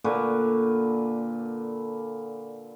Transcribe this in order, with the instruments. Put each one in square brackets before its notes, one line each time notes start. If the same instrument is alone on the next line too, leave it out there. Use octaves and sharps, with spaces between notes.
[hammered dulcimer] A#2 D3 B4 C#6